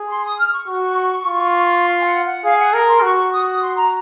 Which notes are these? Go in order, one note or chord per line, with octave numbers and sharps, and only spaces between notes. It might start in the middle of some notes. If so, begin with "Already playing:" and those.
Already playing: G#4
C6
D#6
F6
C#6
F#4
F4
C6
G#5
F#5
F#5
G#4 F5
F#5
A#4 G#5
C6
F#4 C#6
D#6
C6
A#5